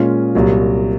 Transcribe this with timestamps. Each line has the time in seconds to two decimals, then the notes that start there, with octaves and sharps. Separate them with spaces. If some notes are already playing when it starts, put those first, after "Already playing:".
Already playing: A#2 G#3 C#4 F4
0.35 C2 A#2 F#3